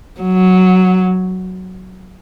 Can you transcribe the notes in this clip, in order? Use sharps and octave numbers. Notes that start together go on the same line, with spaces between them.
F#3